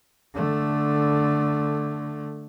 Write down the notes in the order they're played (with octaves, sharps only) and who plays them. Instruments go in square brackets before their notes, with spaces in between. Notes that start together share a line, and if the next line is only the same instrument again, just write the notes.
[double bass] D3 A3